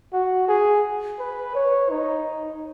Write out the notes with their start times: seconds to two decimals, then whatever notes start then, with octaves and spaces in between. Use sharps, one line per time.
0.13 F#4
0.48 G#4
1.19 B4
1.55 C#5
1.90 D#4